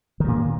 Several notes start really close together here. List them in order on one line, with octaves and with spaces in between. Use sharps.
D#3 G2 A#2